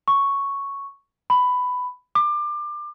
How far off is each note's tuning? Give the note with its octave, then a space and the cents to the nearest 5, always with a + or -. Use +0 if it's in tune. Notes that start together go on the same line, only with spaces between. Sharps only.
C#6 +0
B5 +10
D6 +25